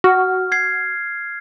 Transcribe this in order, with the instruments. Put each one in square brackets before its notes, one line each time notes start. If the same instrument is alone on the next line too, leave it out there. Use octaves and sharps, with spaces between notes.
[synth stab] F#4 [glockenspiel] F6
[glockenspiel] G#6 C7